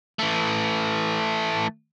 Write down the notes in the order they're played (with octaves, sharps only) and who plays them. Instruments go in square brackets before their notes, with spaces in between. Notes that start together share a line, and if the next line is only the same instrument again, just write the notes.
[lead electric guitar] E3 A3